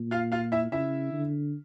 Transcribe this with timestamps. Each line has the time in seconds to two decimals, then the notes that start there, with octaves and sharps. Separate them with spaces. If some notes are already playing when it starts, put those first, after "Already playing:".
Already playing: A#2
0.11 F4 F5
0.32 F4 F5
0.52 E4 E5
0.72 C#3 E4 E5
1.12 D3